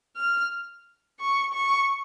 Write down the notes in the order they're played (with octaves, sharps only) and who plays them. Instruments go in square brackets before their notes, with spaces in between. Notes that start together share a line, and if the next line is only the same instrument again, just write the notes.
[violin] F6
C#6
C#6